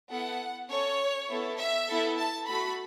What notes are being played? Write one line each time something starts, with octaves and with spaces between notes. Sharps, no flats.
B3 E4 A4 F#5
C#4 A4 C#5
B3 E4 A4
E5
B3 E4 A4
A5
A3 F#4 A4 B5